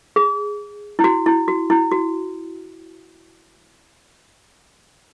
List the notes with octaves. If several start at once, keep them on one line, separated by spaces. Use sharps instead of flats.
G#4
E4
F#4
E4
F#4
E4
F#4